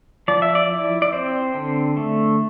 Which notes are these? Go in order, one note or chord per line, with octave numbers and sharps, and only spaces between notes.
F3 D5
E5
D5
E4
D5
C4 C5
D3
A3